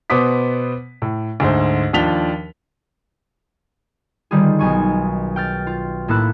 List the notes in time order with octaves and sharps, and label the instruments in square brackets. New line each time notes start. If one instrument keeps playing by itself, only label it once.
[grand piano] B2 B3 C5 D6 D#6 B6
A2
D2 G#2 C5
D#2 F3 D4 B6 F7 G7
[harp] D3 D#3 G3 F4 G#4
B1 G#5 C#6
G5 F6 A6
F4
A2 A#3 E4 A4 F#6 E7